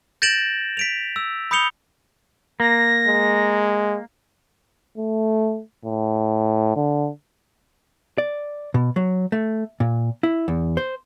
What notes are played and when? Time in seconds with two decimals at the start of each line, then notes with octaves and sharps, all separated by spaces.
0.22 G6 A6 A#6 D7 E7 F#7
0.77 B6 D7 F7
1.16 E6
1.51 B5 D#6 G6 C#7 F7 G7
2.60 A#3 A#6
3.07 G#3
4.98 A3
5.85 A2
6.76 D3
8.18 D5
8.74 B2
8.96 F#3
9.32 A3
9.80 A#2
10.23 E4
10.48 E2
10.77 C5